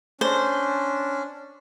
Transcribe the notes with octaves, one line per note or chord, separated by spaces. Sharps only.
C#4 D4 C5